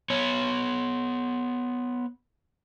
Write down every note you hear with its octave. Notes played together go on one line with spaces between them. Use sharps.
B3 C#5